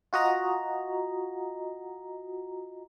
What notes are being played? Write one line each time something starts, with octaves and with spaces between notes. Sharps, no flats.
F4 F#4 D#5 A#5